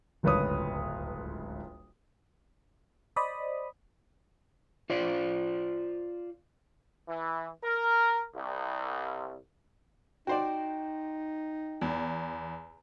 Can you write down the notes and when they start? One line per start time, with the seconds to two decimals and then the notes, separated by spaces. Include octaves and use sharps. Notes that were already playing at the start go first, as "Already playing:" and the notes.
0.23 D1 G1 C#2 B4 C#5 D#6
3.16 C5 D5 D#5 B5 D#6
4.90 F4 C5 D5
7.09 E3
7.64 A#4
8.36 C2
10.27 D#4 F#4 C5 D5 G5
11.81 E2